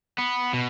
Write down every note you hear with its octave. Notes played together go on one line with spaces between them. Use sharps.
B3
B2